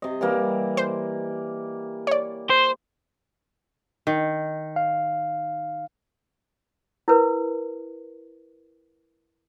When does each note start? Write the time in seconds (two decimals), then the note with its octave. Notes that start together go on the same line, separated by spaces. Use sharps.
0.02 C3 D#5
0.21 E3 G3 A#3
0.77 C5
2.07 C#5 D5
2.50 C5
4.07 D#3
4.76 F5
7.08 E4 A#4 B4